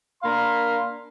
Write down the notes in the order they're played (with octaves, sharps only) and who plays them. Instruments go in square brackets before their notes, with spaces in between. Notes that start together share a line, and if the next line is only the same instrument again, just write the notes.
[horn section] A#3 D4 A#4 F5 B5 C6